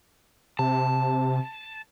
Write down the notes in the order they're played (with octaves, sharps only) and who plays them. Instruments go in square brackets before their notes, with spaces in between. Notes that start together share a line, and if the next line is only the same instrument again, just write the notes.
[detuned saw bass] C3 [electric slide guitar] A5